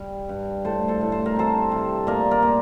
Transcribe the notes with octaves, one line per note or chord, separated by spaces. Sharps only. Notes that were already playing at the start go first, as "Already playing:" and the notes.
Already playing: G3
G2
A2 A4 C5
A4 C5
A2
C5
A#4
C3 A4 C5
C3
A#2 A#4 D5
A#4 D5
A#2